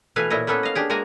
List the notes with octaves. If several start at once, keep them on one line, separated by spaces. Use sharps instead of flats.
B2 E3 A3 B4 F5 G#5
A#2 E4 C#5 D#5
A#3 B3 C#4 A4 B4
D#5 F5
D4 G4 G#4
G#3 A#3 F#4 G#5 A#5